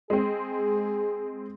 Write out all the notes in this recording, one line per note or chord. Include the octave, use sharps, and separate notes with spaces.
G#3 C4 G#4